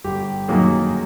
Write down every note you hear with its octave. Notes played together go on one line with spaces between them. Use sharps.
G1 G4
F#2 D#3 F#3 A#3 G#4